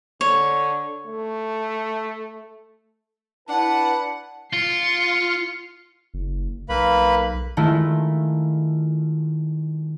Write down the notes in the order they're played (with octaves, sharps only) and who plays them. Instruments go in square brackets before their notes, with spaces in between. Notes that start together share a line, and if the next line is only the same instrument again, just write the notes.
[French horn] D3 [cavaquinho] C#5
[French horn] A3
[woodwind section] D4 E4 B4 [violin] F#5 [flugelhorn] A5
[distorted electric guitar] F4 [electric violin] C7 C#7
[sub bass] F#1
[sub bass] B1 [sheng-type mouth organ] A#3 B4 B5
[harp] D#3 G#3 A3 E4 F4